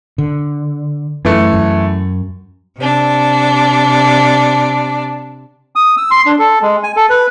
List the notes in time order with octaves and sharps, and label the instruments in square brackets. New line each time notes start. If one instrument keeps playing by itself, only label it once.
[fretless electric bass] D3
[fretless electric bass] F#2 [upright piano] E3 A3
[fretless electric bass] F#2
[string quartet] C3 D4
[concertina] D#6
E6
C6
D4
A4
G#3
G#5
A4
B4